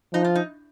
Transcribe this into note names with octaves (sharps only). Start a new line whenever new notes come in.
F3 D#4
F4
D#4